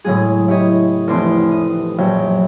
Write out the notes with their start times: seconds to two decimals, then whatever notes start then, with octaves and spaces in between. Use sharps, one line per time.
0.04 A2 C#3 F#3 G#3 G#4
0.48 E4 G4 C#5 D#5
1.07 F1 E2 A3 C4 C6 D6
1.51 D#6
1.98 A#1 F#2 F#3 G5